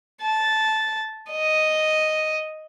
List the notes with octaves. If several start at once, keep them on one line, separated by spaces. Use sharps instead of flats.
A5
D#5